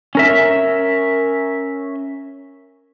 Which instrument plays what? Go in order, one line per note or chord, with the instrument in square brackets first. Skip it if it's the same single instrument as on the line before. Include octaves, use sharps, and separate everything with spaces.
[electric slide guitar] C#4 A#4 E5